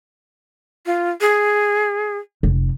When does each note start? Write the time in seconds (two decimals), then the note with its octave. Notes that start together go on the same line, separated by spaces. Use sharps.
0.86 F4
1.21 G#4
2.43 F1